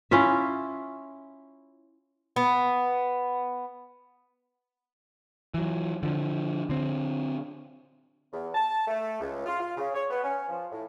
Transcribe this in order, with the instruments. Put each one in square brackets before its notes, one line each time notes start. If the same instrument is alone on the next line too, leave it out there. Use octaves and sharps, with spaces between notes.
[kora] C#4 E4 F4 E5
[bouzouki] B3
[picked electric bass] E3 F#3
D3 F3
D3 C4
[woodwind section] E2
A5
A3
C#2
F4
F4
C#3
C#5
B3
C#4
F3
A2